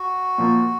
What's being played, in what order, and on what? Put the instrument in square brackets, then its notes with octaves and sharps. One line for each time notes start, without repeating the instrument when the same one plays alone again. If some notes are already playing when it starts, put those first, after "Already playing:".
Already playing: [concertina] F#4
[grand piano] A#2 F3 A#3